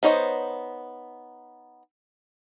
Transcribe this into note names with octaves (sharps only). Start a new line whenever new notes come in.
B3 D#4 C5 C#5 D#5